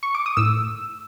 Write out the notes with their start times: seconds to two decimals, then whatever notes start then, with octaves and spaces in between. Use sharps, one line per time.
0.03 C#6
0.15 D6
0.26 D#6
0.37 A2 E6